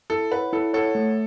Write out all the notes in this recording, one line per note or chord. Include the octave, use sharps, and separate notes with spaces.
E4 A4
B4 C#5 F#5
E4 A4
A4 C#5 F#5
A3